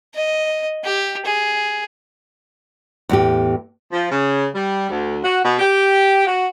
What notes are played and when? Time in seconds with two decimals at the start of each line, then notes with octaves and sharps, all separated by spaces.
0.15 D#5
0.84 G4
1.25 G#4
3.09 E2 A2 G4
3.91 F3
4.11 C#3
4.54 G3
4.89 D2
5.24 F#4
5.44 B2
5.59 G4
6.26 F#4